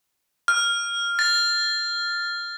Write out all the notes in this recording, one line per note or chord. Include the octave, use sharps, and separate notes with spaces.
F6
A6